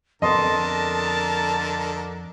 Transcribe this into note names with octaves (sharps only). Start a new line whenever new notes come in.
F2 D3 B3 A4 A#4 D#5 A5 C6